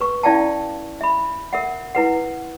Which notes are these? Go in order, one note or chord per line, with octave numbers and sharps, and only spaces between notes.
B4 C#6
C#4 E4 D5 F5 G5 A5
E5 B5
A#4 E5 F#5
E4 B4 F#5